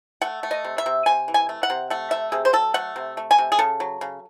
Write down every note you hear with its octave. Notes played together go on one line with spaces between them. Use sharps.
A3 F#5
A3
D#5
C3
E5
C3
C3 G#5
E3
G#5
A3
F#5
C3
A3 F#5
C3 E5
C3 G#4
C5
F#3 A4
A3 F#5
C3
A3
G#5
C3
G#4
C#3 A4
F#3
C#3